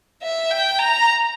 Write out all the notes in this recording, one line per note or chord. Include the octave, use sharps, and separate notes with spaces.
E5
G5
A#5